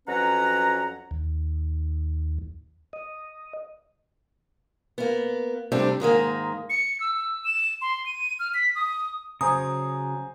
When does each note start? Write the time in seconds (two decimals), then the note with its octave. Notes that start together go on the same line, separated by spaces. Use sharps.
0.08 F2 F#3 C#4 B4 F#5 A#5
1.11 D#2
2.93 D#5
4.98 A#3 B3
5.72 C3 G3 A3 C4 D4 G4
6.00 G#2 D#3 G#3 A#3
6.70 C#7
7.00 E6
7.16 E6
7.44 E7
7.82 C6
8.06 D#7
8.39 F6
8.54 B6
8.75 D#6
9.41 C#3 F#3 C5 G#5 A#5 D#6